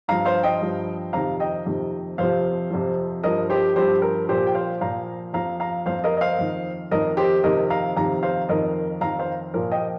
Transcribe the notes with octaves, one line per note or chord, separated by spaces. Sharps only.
G2 F3 F5 A#5
C5 F5
D#5 G5
G2 F3
F2 C3 D#3 F5 A#5
D#5 G5
F2 C3 D#3
F2 C3 F3 C5 F5
F2 C3 F3
G2 F3 A#4 D#5
G4 C5
G2 F3 G4 C5
A#4
A#2 F3 G4 C5
G5
C5 F5
A#2 F3 F5 A#5
F2 F3 F5 A#5
F5 A#5
F2 F3 C5 F5
A#4 D#5
D#5
C5 F5
F2 D#3
F2 D#3 A#4 D#5
G4 C5
F2 C3 D#3 A#4 D#5
F5 A#5
F2 C3 D#3 F5 A#5
C5 F5
F2 D#3 A#4 D#5
F2 D#3 F5 A#5
C5 F5
A#2 F3 A#4
D#5 G5